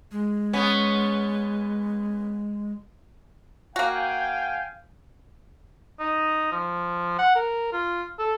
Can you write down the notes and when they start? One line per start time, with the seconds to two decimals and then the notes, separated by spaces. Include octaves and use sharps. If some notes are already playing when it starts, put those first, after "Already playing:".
0.12 G#3
0.53 B3 C#4
3.76 A#3 F#4 F5 G5 G#5
5.99 D#4
6.52 F3
7.19 F#5
7.36 A#4
7.73 F4
8.19 A4